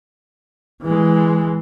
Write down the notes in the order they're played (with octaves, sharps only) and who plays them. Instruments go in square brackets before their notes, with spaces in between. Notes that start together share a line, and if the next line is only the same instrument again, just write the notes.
[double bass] E3 G#3